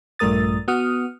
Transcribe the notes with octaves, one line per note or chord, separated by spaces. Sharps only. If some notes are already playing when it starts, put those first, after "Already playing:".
A#1 G2 A3 A#4 D#6 A6
B3 F#4 D#6 F6